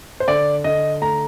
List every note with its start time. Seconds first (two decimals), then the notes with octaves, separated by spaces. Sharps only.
0.20 C5
0.28 D3 D5
0.64 D3 D#5
1.02 A3 A#5